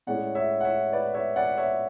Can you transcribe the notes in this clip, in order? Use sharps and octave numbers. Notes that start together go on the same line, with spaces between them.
A2 G#3 C#4 E4 D5 F#5
C#5 E5
F#5
C#5 E5
B4 D5
C#5 E5
D5 F#5
C#5 E5